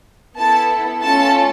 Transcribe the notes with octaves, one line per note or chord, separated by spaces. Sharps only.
B3 E4 A4 A5
A3 C#4 F4 A4 A5